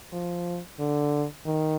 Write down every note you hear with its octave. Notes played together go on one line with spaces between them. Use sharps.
F3
D3
D#3